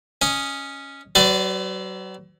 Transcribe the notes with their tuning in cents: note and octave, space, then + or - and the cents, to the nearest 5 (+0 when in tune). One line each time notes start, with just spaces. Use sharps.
C#4 +0 D#5 +0
F#3 +40 B4 +40 D5 +0